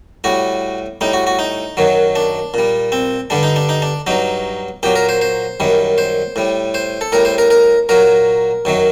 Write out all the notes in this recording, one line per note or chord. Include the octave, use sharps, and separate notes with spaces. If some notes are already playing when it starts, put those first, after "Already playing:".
A2 G3 F#4
A2 G3 D#4
F#4
F#4
D#4
F#2 D#3 F#3
D4
A#2 G3
C4
G2 D3 G3 D4
D#4
D4
D#4
D4
G2 F#3 D#4
A#2 F#3 G4
A#4
C5
C5
F#2 D#3 G3
C5
A2 G3
C5
A4
A2 G3 A#4
C5
A#4
A#4
A#2 F#3 A#4
F#2 D#3 F#3